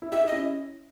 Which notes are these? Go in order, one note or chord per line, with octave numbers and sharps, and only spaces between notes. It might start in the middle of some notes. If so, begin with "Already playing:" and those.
E4
D#4 G4 E5
G4 D#5
C#4 E4